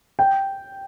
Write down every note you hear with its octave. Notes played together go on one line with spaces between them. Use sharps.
G5